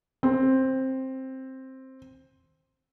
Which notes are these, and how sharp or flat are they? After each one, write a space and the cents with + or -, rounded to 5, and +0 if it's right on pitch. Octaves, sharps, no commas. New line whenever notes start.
C4 +10